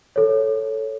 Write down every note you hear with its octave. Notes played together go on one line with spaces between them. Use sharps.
A4 C#5